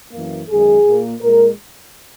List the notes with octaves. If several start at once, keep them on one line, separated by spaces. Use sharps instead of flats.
F#2 E3 A#3
F#2 D#3 G#3 G#4
A#2 A#3
A#2 G#3 A#4